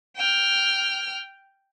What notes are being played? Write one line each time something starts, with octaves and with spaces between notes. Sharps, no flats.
G5 F6